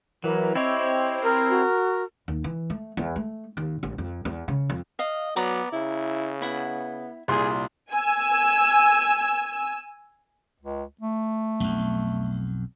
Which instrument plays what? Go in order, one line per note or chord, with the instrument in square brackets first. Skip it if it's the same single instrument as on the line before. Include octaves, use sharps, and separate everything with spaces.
[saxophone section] E3 [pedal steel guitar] F#3 [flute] A#4
[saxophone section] C4 [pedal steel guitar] E4 G4 C#5 [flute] D#5
[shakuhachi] A#4
[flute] F#4
[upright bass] D#2
E3
A3
E2
A3
D#2
A1
F2
E2
C#3
F2
[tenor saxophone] D#5 [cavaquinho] F5
[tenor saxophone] F#3 [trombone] B3 [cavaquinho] D5 A#5 D6
[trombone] C#3 [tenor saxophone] E4
[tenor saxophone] B3 [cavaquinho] E4 F#5
[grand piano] C2 A#2 C6 [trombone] G#4
[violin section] G#5 E6
[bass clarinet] C#2
A3
[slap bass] B1 F2